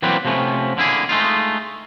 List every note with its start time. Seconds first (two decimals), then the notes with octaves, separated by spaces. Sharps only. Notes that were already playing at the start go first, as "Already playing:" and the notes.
0.02 E3 F#3 G3 A#3 C4 B4
0.25 C3 F3 A3 B3 C#4
0.77 D3 A#3 E4 G#4
1.09 G#3 A3 D#4 F4